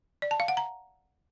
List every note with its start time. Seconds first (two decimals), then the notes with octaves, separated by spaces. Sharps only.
0.22 D5
0.31 A5
0.40 F5
0.48 F#5
0.57 A#5